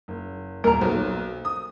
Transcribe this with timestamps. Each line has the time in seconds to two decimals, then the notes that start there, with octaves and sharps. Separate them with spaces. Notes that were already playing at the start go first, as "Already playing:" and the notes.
0.08 F#1
0.64 D#1 A#4 A#5
0.81 B1 F#3 C5
1.45 D#6